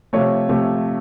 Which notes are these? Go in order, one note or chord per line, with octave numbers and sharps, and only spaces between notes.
C3 F3 A3 C#5
C3 F3 A3